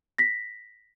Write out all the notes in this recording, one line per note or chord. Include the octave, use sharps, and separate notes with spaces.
A#6 B6